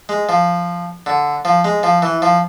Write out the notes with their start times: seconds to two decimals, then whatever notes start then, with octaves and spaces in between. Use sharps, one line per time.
0.09 G#3
0.29 F3
1.06 D3
1.45 F3
1.65 G#3
1.83 F3
2.02 E3
2.22 F3